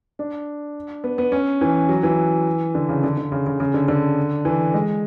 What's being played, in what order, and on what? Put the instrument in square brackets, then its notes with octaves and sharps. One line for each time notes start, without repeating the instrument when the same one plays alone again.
[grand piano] D4
B3
B3
C#4
E3
F#3
E3
D3
C#3
D3
D3
C#3
C#3
C#3
D3
D3
E3
G#3